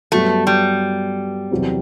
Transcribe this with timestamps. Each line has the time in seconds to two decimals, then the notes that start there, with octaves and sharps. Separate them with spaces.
0.12 G2 F#3 A3 B3 F#4
0.47 G3
1.51 E2 C3 F#3 C4 E4